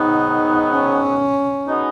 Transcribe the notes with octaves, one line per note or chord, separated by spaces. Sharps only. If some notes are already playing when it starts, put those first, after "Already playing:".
Already playing: G#2 D#3 F#3 B3 D#4
C#4
B2 G#3 B3 D#4